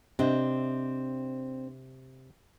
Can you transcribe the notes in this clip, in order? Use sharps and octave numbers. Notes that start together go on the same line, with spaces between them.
C3 C4 D4 D#5